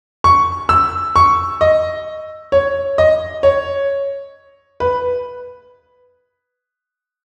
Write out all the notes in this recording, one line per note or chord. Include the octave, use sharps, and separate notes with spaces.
C#6
E6
C#6
D#5
C#5
D#5
C#5
B4